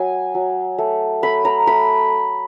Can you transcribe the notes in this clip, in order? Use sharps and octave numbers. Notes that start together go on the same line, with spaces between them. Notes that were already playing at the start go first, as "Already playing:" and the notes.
Already playing: F#3 G#5
F#3
A3
A3 B5
A#5
A3 B5